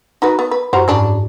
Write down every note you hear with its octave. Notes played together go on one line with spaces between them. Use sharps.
D#4 F#4 B4
B3
B4
F#2 F#4 G4 C5 A#5
G#2 C#3 D4